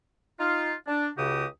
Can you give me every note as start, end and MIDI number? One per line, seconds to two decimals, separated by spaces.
0.40 0.73 63
0.40 0.73 65
0.87 1.08 62
1.17 1.45 37
1.17 1.45 49
1.17 1.45 66
1.17 1.45 67
1.17 1.45 87